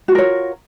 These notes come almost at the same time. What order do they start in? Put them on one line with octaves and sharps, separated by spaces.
F#4 F4 A#4 C#5